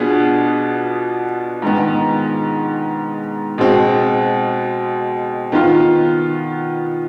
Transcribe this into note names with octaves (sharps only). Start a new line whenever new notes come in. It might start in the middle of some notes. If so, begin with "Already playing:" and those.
Already playing: B2 B3 D4 F4 G#4
G#2 D#3 B3
B2 G#3 C4
D#3 B3 F4